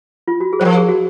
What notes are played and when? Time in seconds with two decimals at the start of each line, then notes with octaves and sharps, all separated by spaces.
0.28 F4
0.40 F#4
0.53 G#4
0.60 F#3 C5
0.65 F3 A#4
0.77 G#4
0.89 F#4